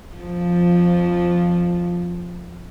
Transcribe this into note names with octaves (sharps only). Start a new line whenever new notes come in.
F2 F3